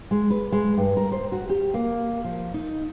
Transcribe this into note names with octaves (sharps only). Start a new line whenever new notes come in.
G#3
B4
G#3
G2
A#4
C5
F#4
G4
A#3
F3
D#4